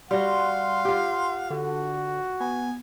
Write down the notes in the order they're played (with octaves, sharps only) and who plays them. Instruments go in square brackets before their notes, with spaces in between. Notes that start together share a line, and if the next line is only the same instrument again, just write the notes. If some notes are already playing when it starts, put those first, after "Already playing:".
[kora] G3 F#4 [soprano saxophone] F5 [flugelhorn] F#5 [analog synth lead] C6
[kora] F4 G4
[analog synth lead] D3 [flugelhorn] F#4
[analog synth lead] B3 [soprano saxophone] G#5